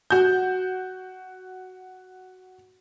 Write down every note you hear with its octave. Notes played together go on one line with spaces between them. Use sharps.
F#4 G6